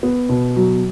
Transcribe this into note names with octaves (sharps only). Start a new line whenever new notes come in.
B3
B2
F#3